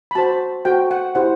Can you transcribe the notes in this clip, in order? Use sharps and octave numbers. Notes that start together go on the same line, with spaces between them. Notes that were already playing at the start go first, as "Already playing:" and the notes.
B5
F#4 C5 A5
F#4 A4 C5 G5
F#5
E4 G4 C5 F#5